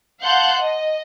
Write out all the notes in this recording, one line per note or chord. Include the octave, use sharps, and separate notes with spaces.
F5 F#5 A5 C6 F#6 G6
D#5